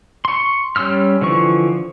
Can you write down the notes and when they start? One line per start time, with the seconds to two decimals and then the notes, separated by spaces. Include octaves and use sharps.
0.25 C6 C#6
0.76 G3 C#4 C6 E6 F6
1.21 D3 E3 F3 C#6